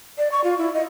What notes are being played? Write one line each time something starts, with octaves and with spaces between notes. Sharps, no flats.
D5
C#6
F4
E4
D#5